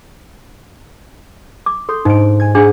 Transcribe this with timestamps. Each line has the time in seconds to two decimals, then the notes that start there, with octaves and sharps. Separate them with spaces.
1.66 D6
1.89 A4 C6 G6
2.05 G#2 D#4 D7
2.40 G#5 G#6
2.55 D4 G#4 F#5 G#5